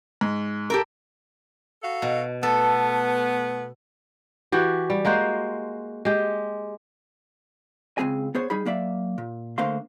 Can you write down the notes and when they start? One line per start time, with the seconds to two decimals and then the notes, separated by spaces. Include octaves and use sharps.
0.21 G#2
0.70 G4 A4 A#4
1.83 F#4 A4 F5
2.02 B2
2.43 A3 B3 A4
4.52 E3 F#4 G4
4.90 G3
5.05 G#3 A#3 F#4 C5
6.05 G#3 G4
7.98 C#2 E3 C4 G#4 G#5
8.35 B3 G#4 C5 C#5
8.50 G3 D#4 G#4 B5
8.65 F#3 A#3 D5 E5
9.18 A#2
9.58 D3 A3 A#3 C5 F5 C6